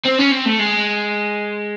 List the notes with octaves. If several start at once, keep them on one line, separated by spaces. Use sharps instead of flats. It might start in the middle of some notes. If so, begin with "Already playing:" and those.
C4
C#4
C4
A3
G#3